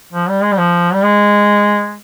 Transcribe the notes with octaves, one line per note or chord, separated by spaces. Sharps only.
F3
G3
G#3
G3
F3
G3
G#3